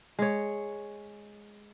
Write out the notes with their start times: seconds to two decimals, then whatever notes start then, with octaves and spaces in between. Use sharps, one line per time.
0.19 G#3 C#5